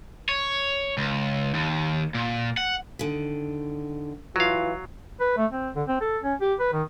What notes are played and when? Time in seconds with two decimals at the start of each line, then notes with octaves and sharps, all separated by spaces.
0.29 C#5
0.98 C#2
1.54 D#2
2.15 A#2
2.57 F#5
2.99 D3 D#3
4.36 E3 F#3 F4 F5
5.20 B4
5.37 A3
5.52 C4
5.76 D3
5.88 C4
6.01 A4
6.23 C#4
6.41 G4
6.60 B4
6.73 D#3